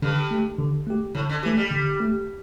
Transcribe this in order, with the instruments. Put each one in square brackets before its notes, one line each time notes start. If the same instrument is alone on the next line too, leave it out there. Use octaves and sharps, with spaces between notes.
[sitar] G2 [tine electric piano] D3
[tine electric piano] A3 G4
D3
A3 G4
[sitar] A2 [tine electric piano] D3
[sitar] D3
[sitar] E3 [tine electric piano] A3 G4
[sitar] G3
[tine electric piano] D3
A3 G4